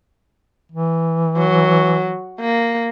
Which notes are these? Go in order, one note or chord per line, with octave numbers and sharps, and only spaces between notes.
E3
F#3
A#3